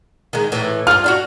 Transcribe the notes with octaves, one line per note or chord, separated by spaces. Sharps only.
D#3 G#3
A2 E3
G2 F4 F6
D4 D#4 F#4